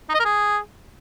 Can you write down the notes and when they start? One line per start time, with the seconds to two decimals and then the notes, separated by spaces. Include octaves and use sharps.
0.09 D#4
0.14 D#5
0.20 A#4
0.25 G#4